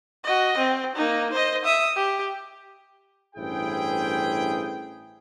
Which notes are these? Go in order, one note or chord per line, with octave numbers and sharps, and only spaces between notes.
F#4 D#5
C4
A#3 D#4
C5 D#5
E5 D#6
G4
A1 G2 E4 G#4 C5 G5